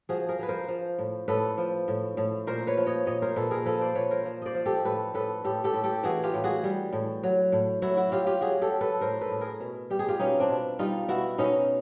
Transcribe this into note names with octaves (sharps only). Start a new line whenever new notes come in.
F3 F#4 G#4
G#4 A#4
F3 B4
A#4 C5
F3
A2
A2 A4 B4
F3
A2
A2
A#2 A#4 C5
B4 C#5
F3
C#5 D#5
A#2 C#5 D#5
A#4 C5
A#2 A4 B4
G#4 A#4
F3 A4 B4
C5 D5
A#2 B4 C#5
A#4 C5
F3
C5 D5 D#5
F3
G4 A4
A2 A4 B4
A2 A4 B4
A2 G4 A4
G4 A4
A2
G4 A4
E3 F#4 G#4
F4 G4
A2
F#4 G#4
G3
A2
F#3
A2
F#3 E4 F#4
E4 F#4
F#3 F4 G4
F4 G4
F#3 F#4 G#4
G4 A4
F#3
A4 B4
A2 A#4 C5
A4 B4
A2
G#4 A#4
B2
G3 G4
G#4
F4 G4
B2 C#4 D#4
C4 D4
B2
G3 D#4 F4
B2 E4 F#4
B2 C#4 D#4